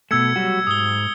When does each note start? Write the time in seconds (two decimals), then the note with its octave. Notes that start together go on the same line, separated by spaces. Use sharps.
0.11 B2 A3 E6 G#6 C#7
0.36 F#3 G3 F#4
0.67 G#2 D#6 G7